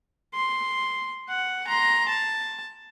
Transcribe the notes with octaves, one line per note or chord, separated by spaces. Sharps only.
C6
F#5
A#5 C6
A5